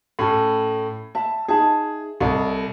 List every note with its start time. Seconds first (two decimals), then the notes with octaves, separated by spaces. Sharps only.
0.19 A2 C#4 A4
1.15 E5 A5 B5
1.48 D#4 G#4 E5 A5
2.20 C2 A4 D5 D#5